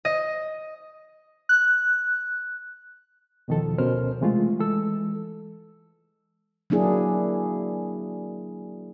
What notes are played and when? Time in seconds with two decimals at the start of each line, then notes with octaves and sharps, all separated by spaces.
0.05 D#5
1.49 F#6
3.48 E2 B2 D#3 F3 A4
3.78 D2 B2 C#4 A#4 C5 F6
4.21 C3 E3 G#3 A3 F4
4.60 E3 G#3 A4 E6
6.70 F#3 A#3 D4 E4 G#4